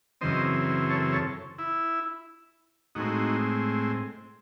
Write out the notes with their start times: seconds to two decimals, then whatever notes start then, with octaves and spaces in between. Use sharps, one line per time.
0.21 F#2 C#3 E3 C4 C5 D#5
0.89 A4 C#5
1.13 A4 C#5
1.59 E4
2.95 A2 G#3 C4 D#4 F#4